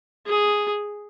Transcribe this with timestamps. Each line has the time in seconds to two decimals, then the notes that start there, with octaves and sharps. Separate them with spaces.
0.27 G#4